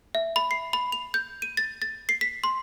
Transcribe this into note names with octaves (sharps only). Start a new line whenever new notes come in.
E5
B5
C7
B5
F7
G6
D#7
A6
A6
C7
B6
C6